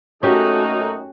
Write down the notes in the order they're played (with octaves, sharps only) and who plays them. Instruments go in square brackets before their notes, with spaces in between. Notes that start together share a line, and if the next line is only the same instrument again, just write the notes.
[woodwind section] F#2 A#3 D#4 [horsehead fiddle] A3 A4 [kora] C#4 G4 [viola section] F#4